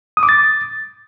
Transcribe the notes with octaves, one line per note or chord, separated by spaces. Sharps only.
D#6
D6
A6